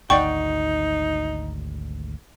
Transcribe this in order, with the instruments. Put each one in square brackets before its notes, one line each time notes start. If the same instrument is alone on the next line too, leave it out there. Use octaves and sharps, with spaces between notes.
[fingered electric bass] G#1 D2 [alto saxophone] D#4 [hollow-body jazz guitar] D5 F#5 G5 [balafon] C#6